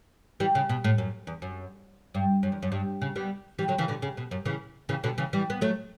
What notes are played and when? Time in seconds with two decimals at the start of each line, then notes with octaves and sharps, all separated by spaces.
0.40 E3 G3
0.55 C#3
0.69 B2
0.84 A2
0.98 F#2
1.27 E2
1.42 F#2
2.15 G2
2.43 F#2
2.52 E2
2.63 F#2
2.72 G2
3.02 C#3
3.16 G3 B3
3.59 E3 G3
3.68 D3 F#3
3.78 C#3 E3
3.88 B2 D3
4.02 C#3
4.17 B2
4.31 F#2
4.45 C#3 E3
4.89 C#3 E3
5.04 B2 D3
5.18 C#3 E3
5.33 E3 G3
5.50 B3
5.61 F#3 A3